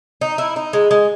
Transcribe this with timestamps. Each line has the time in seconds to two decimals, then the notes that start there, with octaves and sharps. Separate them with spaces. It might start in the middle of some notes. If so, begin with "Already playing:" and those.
0.21 D#4
0.38 E4
0.56 D#4
0.73 G#3
0.91 G#3